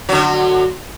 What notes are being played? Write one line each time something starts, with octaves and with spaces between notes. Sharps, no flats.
D3 F#3